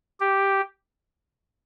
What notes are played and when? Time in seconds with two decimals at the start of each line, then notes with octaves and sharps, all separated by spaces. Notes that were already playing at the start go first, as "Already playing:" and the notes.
0.20 G4